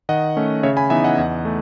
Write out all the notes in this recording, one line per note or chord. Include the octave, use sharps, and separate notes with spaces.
D#3 D#5 F#5
A3 C#4
C#3 C#5 E5
G#5 B5
E3 B3 D#4 E5 G#5
D#5 F#5
E2
A3